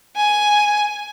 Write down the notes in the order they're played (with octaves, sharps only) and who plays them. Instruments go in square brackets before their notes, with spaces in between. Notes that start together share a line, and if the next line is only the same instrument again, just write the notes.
[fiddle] G#5